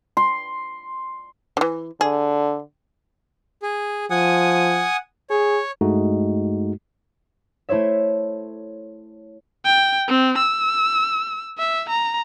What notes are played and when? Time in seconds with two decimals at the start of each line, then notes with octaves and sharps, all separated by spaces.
0.17 C6
1.57 D3 E3
2.01 D3 G#4
3.62 G#4
4.10 F3 F#5 G#5 D#6
5.30 G#4 C#5
5.81 G2 G#3 A3 D#4 F#4
7.69 A3 E4 C5 C#5 E5
9.65 G5
10.08 C4
10.38 E6
11.58 E5
11.89 A#5